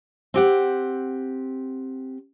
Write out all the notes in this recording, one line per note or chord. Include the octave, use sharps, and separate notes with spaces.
C4 G4 F#5